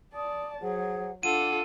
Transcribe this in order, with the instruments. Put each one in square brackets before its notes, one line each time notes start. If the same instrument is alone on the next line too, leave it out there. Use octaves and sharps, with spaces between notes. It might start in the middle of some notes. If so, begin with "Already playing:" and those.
[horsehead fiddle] D5 A5 [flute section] D#6
[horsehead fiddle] F#3 [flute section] G#4 C5 F#5
[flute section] D4 [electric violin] F4 A4 [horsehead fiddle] F#5 [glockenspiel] D#7